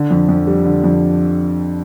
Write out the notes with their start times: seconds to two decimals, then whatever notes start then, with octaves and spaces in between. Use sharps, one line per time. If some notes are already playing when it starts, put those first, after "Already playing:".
Already playing: D3
0.11 F2
0.29 F2
0.47 G3
0.65 D3
0.84 F2